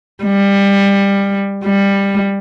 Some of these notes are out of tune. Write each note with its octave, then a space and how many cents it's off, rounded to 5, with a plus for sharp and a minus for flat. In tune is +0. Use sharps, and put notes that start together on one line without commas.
G3 +20
G3 +15